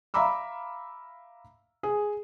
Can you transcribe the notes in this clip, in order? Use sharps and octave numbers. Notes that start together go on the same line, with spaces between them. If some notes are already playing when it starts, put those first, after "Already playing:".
E5 F5 A#5 B5 D6 E6
G#4